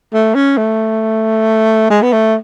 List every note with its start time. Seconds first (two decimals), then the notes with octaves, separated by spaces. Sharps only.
0.13 A3
0.35 C#4
0.58 A3
1.90 G#3
2.02 B3
2.13 A3